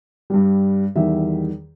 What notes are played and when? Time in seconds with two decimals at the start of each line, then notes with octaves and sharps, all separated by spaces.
0.30 G2 G3
0.96 E2 D#3 G3 E5